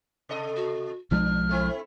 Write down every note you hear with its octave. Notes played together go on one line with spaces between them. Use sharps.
C3 A4 D#5
F#4
B1 F3 G#3 D4 F6
A3 C4 E4